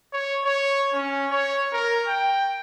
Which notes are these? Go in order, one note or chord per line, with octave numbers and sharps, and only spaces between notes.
C#5
C#5
C#4
C#5
A#4
G5